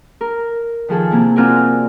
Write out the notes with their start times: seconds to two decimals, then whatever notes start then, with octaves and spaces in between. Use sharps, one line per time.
0.21 A#4
0.89 D#3 F3 G#4 A4
1.11 C3 A#3 E4
1.36 C4 F4 F#4 A#4 D5 G#5